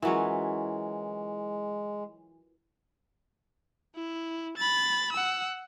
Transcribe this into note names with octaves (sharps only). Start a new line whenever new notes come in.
E3 F#3 G#3 C#4 E4 F4 A#4
E4
B5 A6
F#5 E6